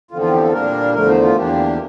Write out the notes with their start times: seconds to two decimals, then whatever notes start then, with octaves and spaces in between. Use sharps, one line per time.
0.11 E2 D3 F3 C4 F4
0.21 F4
0.32 G4
0.42 A4
0.53 A#2 G3 A#3 D4 A#4
0.94 E2 D3 F3 A3 A#4
1.08 C5
1.22 F4
1.36 E2 E3 A#3 D4 G4